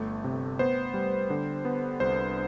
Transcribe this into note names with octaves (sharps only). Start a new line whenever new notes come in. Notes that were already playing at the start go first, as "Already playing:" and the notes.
Already playing: G1 A3
C3
B3 C5
G3
D3
B3
C2 C5